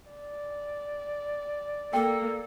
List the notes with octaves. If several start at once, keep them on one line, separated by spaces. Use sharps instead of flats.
D5
A#3 A4 G5